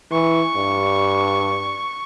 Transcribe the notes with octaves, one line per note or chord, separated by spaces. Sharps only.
E3 C#6
G2